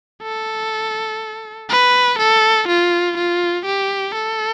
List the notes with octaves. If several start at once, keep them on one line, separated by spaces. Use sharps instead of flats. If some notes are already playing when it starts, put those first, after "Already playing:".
A4
B4
A4
F4
F4
G4
A4